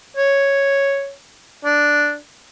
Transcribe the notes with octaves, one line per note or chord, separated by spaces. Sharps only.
C#5
D4